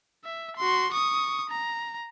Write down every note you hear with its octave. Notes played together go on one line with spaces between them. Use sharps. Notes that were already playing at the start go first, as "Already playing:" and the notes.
E5
F#4 C6
C#6 D#6
A#5